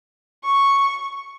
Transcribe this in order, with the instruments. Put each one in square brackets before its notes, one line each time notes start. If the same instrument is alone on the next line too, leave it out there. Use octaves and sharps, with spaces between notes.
[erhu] C#6